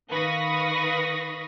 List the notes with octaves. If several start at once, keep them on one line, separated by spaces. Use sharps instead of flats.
D#3 B4 F5 C#6 D#6 A#6